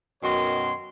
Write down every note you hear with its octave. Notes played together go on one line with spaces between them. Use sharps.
F#2 B2 D#3 F#4 C#5 C6